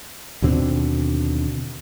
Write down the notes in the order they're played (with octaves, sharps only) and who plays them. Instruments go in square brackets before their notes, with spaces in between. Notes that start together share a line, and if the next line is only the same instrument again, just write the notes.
[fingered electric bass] D#2 B2 D3 C4